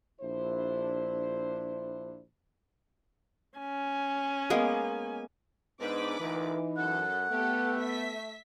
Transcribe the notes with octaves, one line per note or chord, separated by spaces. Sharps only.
A#1 D4 E4 C5
C#4 G#5
G#3 A#3 B3
G#2 B3 D4 D#4 B4 D6
D2 A#2 E3 D#4
F#2 A4 F#5
A3 B3 G4 A4
E5 B6